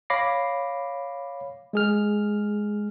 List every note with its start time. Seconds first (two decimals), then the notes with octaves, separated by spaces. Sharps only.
0.10 C#5 F5 B5 D6 A#6 C7
1.73 G#3 G#4 F6